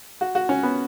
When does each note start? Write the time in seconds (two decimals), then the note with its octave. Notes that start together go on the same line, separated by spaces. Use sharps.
0.21 F#4
0.35 F#4
0.49 C#4
0.63 B3